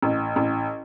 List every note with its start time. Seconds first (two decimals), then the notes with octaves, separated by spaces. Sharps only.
0.02 A1
0.36 A1